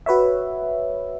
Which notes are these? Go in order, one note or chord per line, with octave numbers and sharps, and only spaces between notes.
F#4 B4 C#5 E5